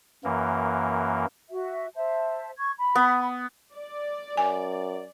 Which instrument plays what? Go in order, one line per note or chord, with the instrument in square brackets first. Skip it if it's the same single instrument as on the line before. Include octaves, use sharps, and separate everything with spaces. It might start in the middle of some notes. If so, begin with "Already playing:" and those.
[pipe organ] F#2 E3 A#3
[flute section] F#4 E5
C5 E5 A5
C#6 G#6
B5
[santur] B3
[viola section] D5
[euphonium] F#2 [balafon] G#5